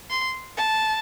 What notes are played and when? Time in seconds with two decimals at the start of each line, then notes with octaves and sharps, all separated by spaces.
0.10 C6
0.57 A5